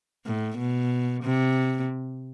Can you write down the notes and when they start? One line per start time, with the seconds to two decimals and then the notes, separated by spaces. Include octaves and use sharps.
0.26 A2
0.58 B2
1.23 C3